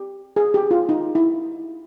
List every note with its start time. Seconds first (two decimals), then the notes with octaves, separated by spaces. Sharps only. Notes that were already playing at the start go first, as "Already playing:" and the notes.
Already playing: G4
0.36 G#4
0.54 G4
0.71 F4
0.89 D#4
1.15 E4